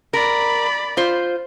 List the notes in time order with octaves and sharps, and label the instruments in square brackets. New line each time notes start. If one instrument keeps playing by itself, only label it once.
[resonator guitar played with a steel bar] A#4 [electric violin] D5 B5
[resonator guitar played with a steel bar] F4 C5